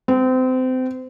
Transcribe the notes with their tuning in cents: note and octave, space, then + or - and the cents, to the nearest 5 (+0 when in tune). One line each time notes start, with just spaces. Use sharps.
C4 -30